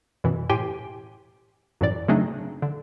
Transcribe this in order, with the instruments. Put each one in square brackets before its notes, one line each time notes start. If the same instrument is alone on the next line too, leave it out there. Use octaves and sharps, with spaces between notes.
[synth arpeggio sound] F#2 B2 E3
A2 G4 G5 G#5 C6
F#2 A2 E3 D5
C#3 F#3 A3 C4 D4 D#4
D3